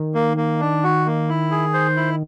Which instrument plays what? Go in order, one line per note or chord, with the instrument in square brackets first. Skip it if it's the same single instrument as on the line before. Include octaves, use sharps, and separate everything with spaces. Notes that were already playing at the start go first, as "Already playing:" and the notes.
Already playing: [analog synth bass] D#3
[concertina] A#3
A#3
D4
F#4
A#3
E4
G#4
C5
E4